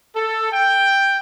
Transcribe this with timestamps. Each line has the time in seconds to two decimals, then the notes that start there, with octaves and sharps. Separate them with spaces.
0.15 A4
0.53 G5